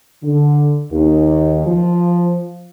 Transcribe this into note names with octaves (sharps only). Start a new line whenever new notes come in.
D3
D#2
F3